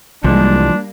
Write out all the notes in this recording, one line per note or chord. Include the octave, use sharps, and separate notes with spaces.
C2 E3 F3 G3 G#3 A#3 D4